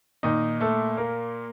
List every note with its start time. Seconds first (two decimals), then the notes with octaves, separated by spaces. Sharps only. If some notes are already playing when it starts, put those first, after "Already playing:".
0.23 A#2 D#3 D#4
0.61 A3 A4
0.97 A#3 A#4